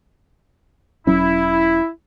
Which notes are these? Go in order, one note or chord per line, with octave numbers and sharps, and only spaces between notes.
E1 F#3 C#4 E4